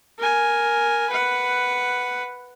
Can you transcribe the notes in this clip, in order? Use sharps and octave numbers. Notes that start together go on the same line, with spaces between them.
A#4 G#5
B4 F#5